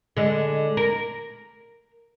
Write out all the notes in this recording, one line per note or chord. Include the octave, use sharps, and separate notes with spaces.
D3 G#3
A#4